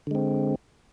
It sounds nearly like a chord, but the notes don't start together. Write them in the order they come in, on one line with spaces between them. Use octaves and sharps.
D3 G#3 C4